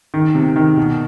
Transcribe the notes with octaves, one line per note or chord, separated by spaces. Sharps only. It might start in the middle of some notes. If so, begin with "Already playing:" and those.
D#3
C3
D#3
B2